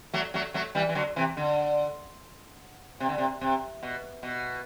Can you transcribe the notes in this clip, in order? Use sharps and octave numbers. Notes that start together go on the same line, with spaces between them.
F#3 A3
F#3 A3
F#3 A3
E3 G3
E3
D3 F#3
C3 E3
D3
C3
D3
C3
C3
B2
B2